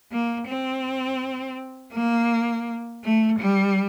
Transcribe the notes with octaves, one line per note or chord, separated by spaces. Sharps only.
A#3
C4
A#3
A3
G3